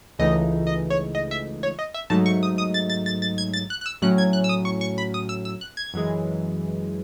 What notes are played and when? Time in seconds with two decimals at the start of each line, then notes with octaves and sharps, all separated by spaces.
0.19 C#2 C#3 E3 A3 D#4 D#5
0.67 D#5
0.90 C#5
1.15 D#5
1.31 E5
1.63 C#5
1.79 D#5
1.94 E5
2.10 G#2 F#3 A3 D#4 A5
2.26 C#6
2.43 D#6
2.58 D#6
2.74 A6
2.90 A6
3.06 A6
3.22 A6
3.38 G#6
3.54 A6
3.70 F#6
3.81 F#6
3.86 E6
4.02 A2 F#3 C#4 F#6
4.18 G#6
4.33 F#6
4.44 E6
4.49 D#6
4.65 C#6
4.81 C#6
4.98 B5
5.14 D#6
5.29 E6
5.45 E6
5.61 F#6
5.77 G#6
5.94 F#2 E3 G#3